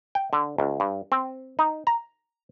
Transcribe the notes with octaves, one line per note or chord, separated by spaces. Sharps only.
G5
D3
C#2
G2
C4
D#4
A#5